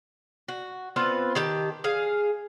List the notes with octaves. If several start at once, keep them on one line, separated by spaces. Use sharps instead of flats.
F#4
B3 C4 F4 B4
D#3 G4 A5
G#4 F5